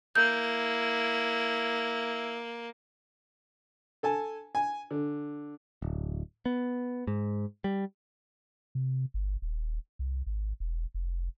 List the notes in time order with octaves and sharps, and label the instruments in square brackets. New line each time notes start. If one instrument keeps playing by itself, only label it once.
[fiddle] A#3 [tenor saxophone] E4 [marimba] G6
[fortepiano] A4 G#5 A5
G#5
D3
[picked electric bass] D1
B3
G#2
G3
[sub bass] C3
G1
D#1
C2
G#1
E1
F1